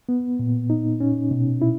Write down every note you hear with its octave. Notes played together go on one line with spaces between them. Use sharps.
B3
A#2
D#4
C#4
B2
E4